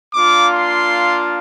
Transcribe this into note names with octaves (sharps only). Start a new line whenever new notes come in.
A#3 D4 F4 D6
C6